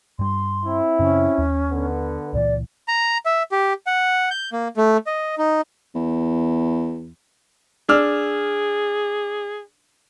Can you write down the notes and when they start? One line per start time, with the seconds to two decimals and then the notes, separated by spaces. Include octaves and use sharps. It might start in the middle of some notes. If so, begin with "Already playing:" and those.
0.19 G2 G3 C6
0.65 C4 E4
0.99 F#2 C#3 C#4
1.38 D#2
1.70 D3 B3
2.33 C#2 A#2 E3 D5
2.88 A#5
3.26 E5
3.52 G4
3.87 F#5
4.31 G6
4.53 A#3
4.77 A3
5.07 D#5
5.38 D#4
5.95 E2
7.89 D4 G#4 E6 F6